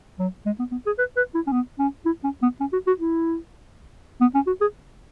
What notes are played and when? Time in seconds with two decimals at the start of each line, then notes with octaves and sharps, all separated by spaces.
0.19 F#3
0.46 G#3
0.59 B3
0.72 B3
0.86 G#4
0.99 B4
1.17 B4
1.35 E4
1.47 C#4
1.52 B3
1.79 C#4
2.06 E4
2.24 C#4
2.42 B3
2.61 C#4
2.73 F#4
2.87 F#4
3.00 E4
4.21 B3
4.35 C#4
4.47 F#4
4.61 G#4